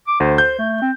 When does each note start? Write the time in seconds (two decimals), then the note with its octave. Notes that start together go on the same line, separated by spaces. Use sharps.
0.07 D6
0.20 D2 C5
0.38 G6
0.58 A3
0.82 C4